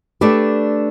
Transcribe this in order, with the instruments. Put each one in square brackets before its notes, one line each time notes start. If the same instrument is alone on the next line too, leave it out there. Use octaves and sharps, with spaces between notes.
[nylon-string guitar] A3 D4 G4 B4 D5